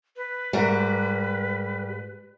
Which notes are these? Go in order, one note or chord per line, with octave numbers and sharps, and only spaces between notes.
B4
G#2 G3 F#4 A#4